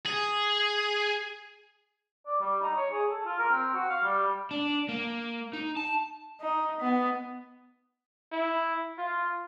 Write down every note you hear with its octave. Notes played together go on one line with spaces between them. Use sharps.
G#4
D5
G3
D#4
C#5
G#4
A4
F4
A#4
C4
F#4
F5
G3
D4
A#3
D#4
A5
D#4
B3
E4
F4